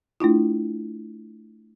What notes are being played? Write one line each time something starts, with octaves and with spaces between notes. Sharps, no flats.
A3 D4 E4 F4